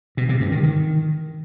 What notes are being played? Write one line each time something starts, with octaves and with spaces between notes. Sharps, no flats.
B2
C3
G2
D#3
D#3